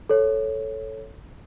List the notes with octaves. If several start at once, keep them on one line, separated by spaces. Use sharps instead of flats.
A4 C#5